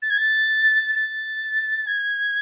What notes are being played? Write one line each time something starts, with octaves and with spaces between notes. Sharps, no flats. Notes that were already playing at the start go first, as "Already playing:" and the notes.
A6
G#6
A6
A6
G#6